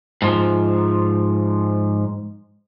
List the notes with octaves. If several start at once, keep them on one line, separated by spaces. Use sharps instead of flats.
G#2 F3